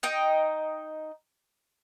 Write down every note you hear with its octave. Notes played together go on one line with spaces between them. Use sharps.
D#4 D#5 G5